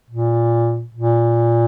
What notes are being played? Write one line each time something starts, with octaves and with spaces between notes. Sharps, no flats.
A#2
A#2